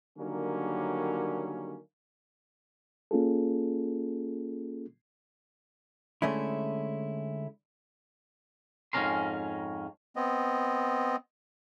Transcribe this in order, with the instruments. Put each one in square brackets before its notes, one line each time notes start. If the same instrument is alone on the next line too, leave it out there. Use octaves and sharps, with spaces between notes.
[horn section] D3 D#3 F#3 G3 A#3 C#4
[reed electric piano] A#3 C#4 F4 G#4 A4
[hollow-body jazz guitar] D3 G#3 A3 C#4 E4
[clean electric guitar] F2 G#2 C#3 C#4 A#4 C6
[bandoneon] B3 C4 D#5